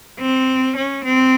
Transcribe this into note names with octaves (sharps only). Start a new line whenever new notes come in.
C4
C#4
C4